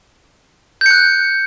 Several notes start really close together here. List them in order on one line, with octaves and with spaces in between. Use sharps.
G6 C#7 F#6